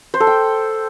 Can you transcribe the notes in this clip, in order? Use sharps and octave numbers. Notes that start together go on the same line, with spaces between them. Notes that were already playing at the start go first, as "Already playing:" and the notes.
C5
A4
G5